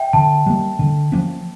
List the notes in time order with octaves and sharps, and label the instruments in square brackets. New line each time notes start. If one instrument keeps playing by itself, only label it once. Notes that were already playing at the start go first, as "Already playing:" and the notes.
Already playing: [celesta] E5 G5
[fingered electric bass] D3 [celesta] A5
[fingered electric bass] G3 A#3
D3
F3 A#3 C#4